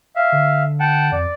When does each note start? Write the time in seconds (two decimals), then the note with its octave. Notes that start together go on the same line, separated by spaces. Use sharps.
0.16 E5 F5
0.32 D3
0.80 F#5 G5 A5
1.12 F2 D5